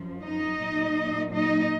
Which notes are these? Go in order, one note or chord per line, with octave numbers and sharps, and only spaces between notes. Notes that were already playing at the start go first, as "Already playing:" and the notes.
Already playing: F#2 F3
D#4 D#5
A#2 F#3
D#4 D#5